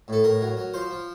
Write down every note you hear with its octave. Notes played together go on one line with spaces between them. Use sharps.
A2 A4
A2 A#4
F#3
F#3
F3 C5
F3